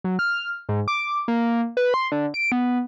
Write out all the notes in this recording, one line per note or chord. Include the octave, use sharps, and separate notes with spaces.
F#3
F6
G#2
D6
A#3
B4
C6
D3
D7
B3